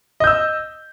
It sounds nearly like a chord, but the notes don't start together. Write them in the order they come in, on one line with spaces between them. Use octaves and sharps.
D#5 G6 E6